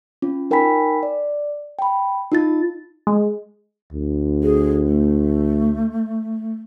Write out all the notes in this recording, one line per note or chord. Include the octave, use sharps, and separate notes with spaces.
C#4 F4
D#4 A#4 G5 G#5 B5 B6
D5
G5 B5
D#4 F4 A6
G#3
D2
G#4
A3